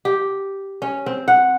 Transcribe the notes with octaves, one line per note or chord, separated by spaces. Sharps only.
G4
C#4
C4
F#5